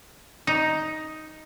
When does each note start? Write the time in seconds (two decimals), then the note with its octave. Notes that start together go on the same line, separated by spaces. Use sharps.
0.47 D#4